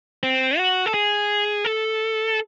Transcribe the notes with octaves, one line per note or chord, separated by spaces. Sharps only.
C4
F#4
A4
G#4
A4